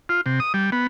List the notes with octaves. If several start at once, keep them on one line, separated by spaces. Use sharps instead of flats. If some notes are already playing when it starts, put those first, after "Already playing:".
F4
C3
D#6
G3
B3